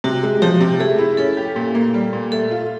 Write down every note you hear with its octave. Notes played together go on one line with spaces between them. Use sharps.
C3 F#4
G#3
F3 G4
C3
A3 G#4
E4
C#4 A4
G4
A#2
A#3
G3
A#2
A3 A4
F4